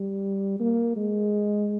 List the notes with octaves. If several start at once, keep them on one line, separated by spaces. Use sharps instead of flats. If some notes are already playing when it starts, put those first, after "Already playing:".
Already playing: G3
A#3
G#3